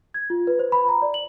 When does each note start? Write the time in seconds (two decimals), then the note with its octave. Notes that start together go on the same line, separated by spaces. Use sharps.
0.14 G#6
0.30 F4
0.47 B4
0.59 C5
0.72 B5
0.89 A#5
1.02 D5
1.14 F#7